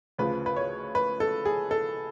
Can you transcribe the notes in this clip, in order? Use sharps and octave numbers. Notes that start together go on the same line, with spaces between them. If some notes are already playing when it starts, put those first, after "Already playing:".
D2 C#3 F3 B4
B4
C#5
B4
A4
G#4
A4